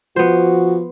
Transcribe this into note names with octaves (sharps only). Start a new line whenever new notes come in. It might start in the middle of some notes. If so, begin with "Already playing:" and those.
F3 B3 F#4 C5